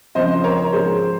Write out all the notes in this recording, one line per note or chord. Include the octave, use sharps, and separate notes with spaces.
C#2 C#3 F3 C4 C5 D#5
A#4 C#5
G#2 F3 G#3 G#4 C5